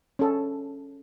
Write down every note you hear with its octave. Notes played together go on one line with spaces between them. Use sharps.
C#4 A4